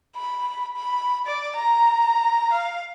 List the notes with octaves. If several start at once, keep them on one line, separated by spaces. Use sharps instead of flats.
B5
B5
D5
A#5
F5